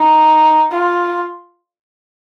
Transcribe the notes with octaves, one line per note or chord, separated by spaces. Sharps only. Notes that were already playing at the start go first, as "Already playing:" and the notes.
Already playing: D#4
F4